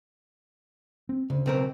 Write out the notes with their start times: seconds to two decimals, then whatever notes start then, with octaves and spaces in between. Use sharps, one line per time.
1.09 C4
1.30 D2 C#3
1.46 B1 C4 A#4